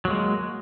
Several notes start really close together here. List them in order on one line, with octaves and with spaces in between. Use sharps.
F#3 A#3 G#3